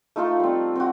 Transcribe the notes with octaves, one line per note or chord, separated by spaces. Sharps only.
A3 D#4 F4 A4
G3 C4
C4 F#4